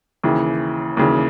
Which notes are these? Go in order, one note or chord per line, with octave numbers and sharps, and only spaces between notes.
D#2 C#3 E3
D#2 C#3 E3